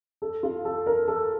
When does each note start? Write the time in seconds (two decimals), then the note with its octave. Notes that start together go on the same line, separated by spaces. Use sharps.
0.22 A4
0.43 F4
0.65 A4
0.86 A#4
1.08 A4